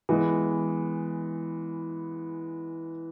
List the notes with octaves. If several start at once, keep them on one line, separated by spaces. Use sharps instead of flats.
E3 G#3 B3